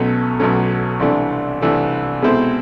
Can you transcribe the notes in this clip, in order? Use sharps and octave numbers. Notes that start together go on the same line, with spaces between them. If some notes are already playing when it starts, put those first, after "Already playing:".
Already playing: B1 B2 F#3 A3 C#4
B1 B2 F#3 A3 C#4
C2 C3 E3 A3 D4
C2 C3 E3 A3 D4
B2 G#3 C4 E4 A4